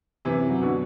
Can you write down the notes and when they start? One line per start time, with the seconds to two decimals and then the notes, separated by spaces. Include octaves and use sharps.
0.25 F#2 C3 E3
0.50 F#3
0.61 B2 D3